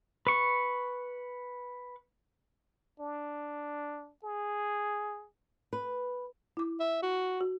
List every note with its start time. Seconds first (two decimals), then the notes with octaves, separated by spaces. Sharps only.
0.27 B4 C#6
3.00 D4
4.24 G#4
5.73 B4
6.57 E4 D6
6.80 E5
7.03 F#4
7.41 F#4